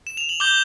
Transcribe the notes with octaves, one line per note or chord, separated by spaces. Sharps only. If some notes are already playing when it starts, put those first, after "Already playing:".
E7
F7
F#7
D6 G6 G7